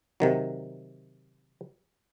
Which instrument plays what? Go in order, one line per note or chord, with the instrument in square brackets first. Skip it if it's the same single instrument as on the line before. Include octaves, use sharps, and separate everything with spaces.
[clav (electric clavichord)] C3 D#3 F#3